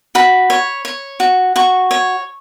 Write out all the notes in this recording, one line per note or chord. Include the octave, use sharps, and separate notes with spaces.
F#4 B5
C#5
C#5
F#4
F#4 C#6
C#5